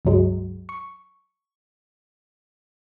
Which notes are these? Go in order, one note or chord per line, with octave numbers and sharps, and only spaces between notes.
C#2 G2 F#3 G#3
C#6